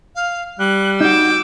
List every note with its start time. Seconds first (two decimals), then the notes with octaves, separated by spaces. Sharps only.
0.15 F5
0.59 G3 F#6
1.01 D#4 F#4 D6 E6 G6